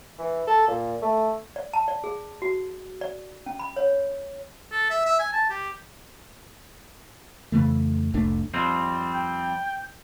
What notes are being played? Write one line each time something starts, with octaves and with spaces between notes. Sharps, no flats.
E3
A4
A#2
A3
D5
A5
D5
G#4
F#4
D5
C#4
B5
C#5
A4
E5
E5
G#5
A5
G4
F2 C#3 E3 A3
F1 C2 A3 D4
F2 G3 C4
G5